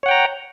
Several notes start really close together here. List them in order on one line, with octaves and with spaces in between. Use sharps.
C#5 F#5 G5 A#5